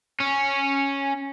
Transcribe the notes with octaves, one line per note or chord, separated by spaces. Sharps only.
C#4